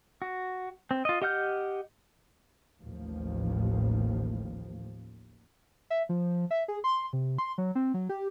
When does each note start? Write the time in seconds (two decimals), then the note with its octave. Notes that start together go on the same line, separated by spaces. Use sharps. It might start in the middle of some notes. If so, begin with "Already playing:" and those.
0.22 F#4
0.91 C4
1.05 F4 D#5
1.22 G4 D#5 F#5 F6 G6
2.81 A1 D#2 A2 F3
5.90 E5
6.09 F3
6.51 E5
6.68 G#4
6.84 C6
7.13 C3
7.38 C6
7.58 F#3
7.75 C4
7.94 F#3
8.09 G4